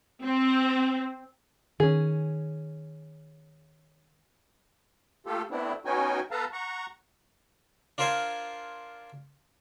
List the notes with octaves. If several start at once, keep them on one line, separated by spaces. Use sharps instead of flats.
C4
D#3 C#4 G#4
A3 A#3 F4 G4 A4
A3 B3 C4 D4 E4
B3 C#4 D#4 F#4 G5 G#5
B3 A4 B4 F5 A5 A#5
F#5 A#5 C#6
D4 F4 A#4 C5 F5 G#5